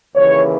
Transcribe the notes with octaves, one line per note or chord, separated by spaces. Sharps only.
D#2 C#3 E3 C#5